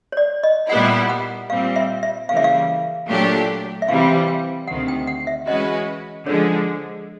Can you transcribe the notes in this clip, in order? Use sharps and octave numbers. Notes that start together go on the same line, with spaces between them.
C#5
D5
D#5
A#2 G3 B3 E4 F#5
F#5
A#2 G3 C4 F5
E5
E5
C#3 E3 G3 A#3 F5
E5
F5
A#2 F#3 A3 D4 G4
E5
C3 E3 G3 F5
G5
D2 C3 D#3 F#5
G5
F#5
E5
E3 G#3 C#4 F#4 B4 D#5
D3 F3 G#3 C#5